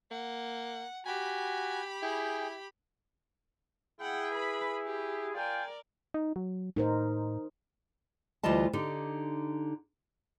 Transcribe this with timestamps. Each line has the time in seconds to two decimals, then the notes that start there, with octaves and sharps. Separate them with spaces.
0.11 A#3 F#5
1.06 F#4 G4 G#5 B5
2.02 E4 G#4 G5
4.00 E4 G#4 F#5 G5
4.33 B4 B5
4.86 G4
5.34 F4 A#4 D5 G5 G#5
6.14 D#4
6.36 F#3
6.77 A2 D#4 A#4 C5
8.43 D2 E3 G3 F4 D#5 A5
8.73 D3 D#4 G4